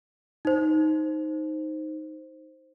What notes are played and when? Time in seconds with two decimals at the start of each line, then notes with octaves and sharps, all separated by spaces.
0.45 D#4 C5